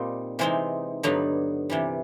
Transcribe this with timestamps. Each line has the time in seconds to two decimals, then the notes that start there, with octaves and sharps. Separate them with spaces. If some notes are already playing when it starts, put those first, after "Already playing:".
Already playing: A#2 G3 C4 D#4
0.39 C3 E3 G#3 C4 D#4
1.03 G2 D3 F#3 B3 D#4
1.70 C3 E3 G3